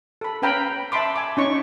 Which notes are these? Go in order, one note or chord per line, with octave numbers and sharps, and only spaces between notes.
A4 B5
C#4 B4 F5 G5 A#5 B5
E5 A5 B5 C6 D6
G#5 D6
C#4 D#4 C#6